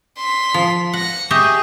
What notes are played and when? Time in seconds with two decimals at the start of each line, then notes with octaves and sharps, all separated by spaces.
0.18 C6 B6
0.54 F3
0.93 F#5 A#6 C#7
1.31 G4 G#4 D#5 E5 C#6 D#6 G6